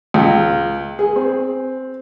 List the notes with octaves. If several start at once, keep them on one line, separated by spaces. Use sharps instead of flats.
C#2
G#4
C4